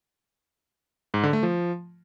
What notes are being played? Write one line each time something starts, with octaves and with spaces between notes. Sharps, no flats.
G#2
D3
A3
F3